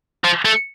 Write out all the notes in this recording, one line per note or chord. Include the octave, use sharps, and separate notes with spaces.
F3
A3